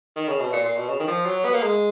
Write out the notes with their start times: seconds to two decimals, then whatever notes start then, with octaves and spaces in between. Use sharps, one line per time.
0.16 D#3
0.28 C#3
0.40 B2
0.53 A#2
0.65 A#2
0.77 B2
0.89 C#3
1.00 D#3
1.08 F3
1.26 F#3
1.45 B3
1.54 A#3
1.63 G#3